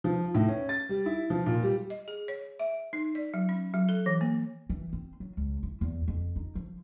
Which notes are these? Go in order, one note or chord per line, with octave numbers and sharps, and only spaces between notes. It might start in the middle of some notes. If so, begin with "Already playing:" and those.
F3
A2
C#4
A6
G3
E4
F3
A#2
G3
D#5
G#4
C#5
E5
D#4
D5
F#3
C#4
F#3
A4
E3
A#3
E3
C4
F#3
C#2
E4
E2
F2
D#4
F3